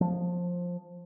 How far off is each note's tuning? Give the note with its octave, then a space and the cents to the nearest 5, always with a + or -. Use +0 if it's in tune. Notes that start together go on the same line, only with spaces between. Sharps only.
F3 +15